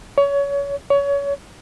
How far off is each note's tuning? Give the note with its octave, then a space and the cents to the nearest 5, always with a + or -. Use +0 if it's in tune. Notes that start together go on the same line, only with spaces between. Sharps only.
C#5 +25
C#5 +25